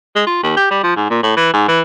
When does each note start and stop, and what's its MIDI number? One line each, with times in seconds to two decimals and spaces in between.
0.16 0.22 56
0.27 0.41 65
0.43 0.53 39
0.57 0.67 67
0.71 0.82 55
0.83 0.94 53
0.97 1.09 44
1.10 1.23 46
1.23 1.37 45
1.37 1.53 52
1.53 1.67 44
1.68 1.81 52